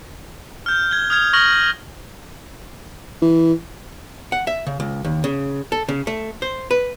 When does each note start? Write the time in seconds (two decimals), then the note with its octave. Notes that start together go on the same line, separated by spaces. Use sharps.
0.66 F6 G6
0.91 G#6 G7
1.10 D#6 F6 G#6 F7
1.33 C#6 D#6 F6 A#6 F7 F#7
3.22 E3
4.32 F#5
4.47 E5
4.67 C#3
4.80 C#2
5.05 D#2
5.24 C#3
5.72 A4
5.88 C#3
6.07 A3
6.42 C5
6.71 B4